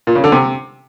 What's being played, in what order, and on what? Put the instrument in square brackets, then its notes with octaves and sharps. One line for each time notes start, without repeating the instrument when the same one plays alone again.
[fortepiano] A#2
C#3
D3
C3